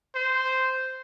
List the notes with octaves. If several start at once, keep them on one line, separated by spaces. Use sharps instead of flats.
C5